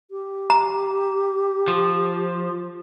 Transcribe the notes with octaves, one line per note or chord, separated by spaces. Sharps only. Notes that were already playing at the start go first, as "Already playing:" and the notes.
G4
A#5
F3